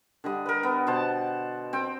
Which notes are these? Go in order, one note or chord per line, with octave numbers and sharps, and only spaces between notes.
D3 G3 D#5
A#4 B4
B3
B2 C5 F#5 A5
C4 G5